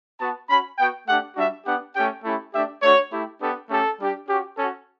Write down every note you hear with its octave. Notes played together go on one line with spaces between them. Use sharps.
B3 F#4 A5
C#4 F#4 B5
B3 F#4 G5
A3 D4 G4 F#5
G3 D4 F#4 E5
B3 D4 G4 F#5
A3 C#4 G4 G5
A3 C#4 E4 G4
A3 D4 G4 E5
A3 D4 F#4 C#5
A3 E4 G4
B3 D4 G4 A4
A3 C#4 G4 A4
G3 D4 G4
C#4 F#4 G4
C#4 F#4 A4